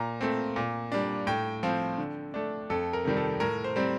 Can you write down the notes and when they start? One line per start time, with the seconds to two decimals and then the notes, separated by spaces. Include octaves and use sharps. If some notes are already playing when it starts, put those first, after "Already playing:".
Already playing: A#2 A#5
0.21 A3 C4
0.56 A#2
0.92 G3 D4
1.27 A2 G5
1.63 F3 C4
1.98 D3
2.34 A3 D4
2.70 F2 A4
2.93 A#4
3.05 C3 D#3 G3
3.17 A4
3.40 A2 A#4
3.64 C5
3.76 G3 C4